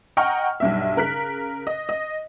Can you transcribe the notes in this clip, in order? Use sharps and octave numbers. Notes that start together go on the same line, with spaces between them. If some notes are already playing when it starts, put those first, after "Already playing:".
D#5 F#5 G5 A#5 C#6 F6
B1 G2 E5
C#3 A#4 F#6 B6
D#5
D#5